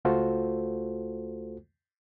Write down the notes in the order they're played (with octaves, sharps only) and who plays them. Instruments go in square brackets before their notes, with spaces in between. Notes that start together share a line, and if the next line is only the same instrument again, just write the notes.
[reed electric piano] C#2 A3 F4 F#4 A4 C5